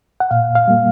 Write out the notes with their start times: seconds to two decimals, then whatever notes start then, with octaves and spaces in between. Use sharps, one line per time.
0.20 F#5
0.31 A#2 F5
0.55 F5
0.68 G3 A#3